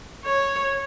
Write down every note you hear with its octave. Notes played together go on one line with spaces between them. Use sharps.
C#5